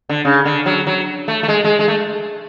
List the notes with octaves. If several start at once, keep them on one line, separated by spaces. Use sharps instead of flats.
D3
C#3
D3
F#3
F#3
A3
A3
G#3
G#3
G#3
A3